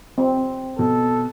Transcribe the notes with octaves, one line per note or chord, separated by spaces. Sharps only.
C4
B2 A4